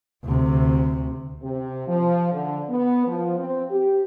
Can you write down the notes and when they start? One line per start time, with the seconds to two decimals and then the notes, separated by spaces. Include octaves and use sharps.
0.24 D2 C3
1.42 C3
1.88 F3
2.32 D3
2.70 B3
3.07 F3
3.39 C4
3.71 G4